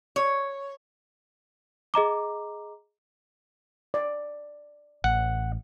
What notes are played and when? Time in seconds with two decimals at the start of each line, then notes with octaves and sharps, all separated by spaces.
0.16 C#5
1.94 G#4 D#5 A#5 D6
3.94 D5
5.04 A1 F#5